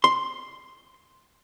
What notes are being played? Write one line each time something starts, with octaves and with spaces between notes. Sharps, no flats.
C6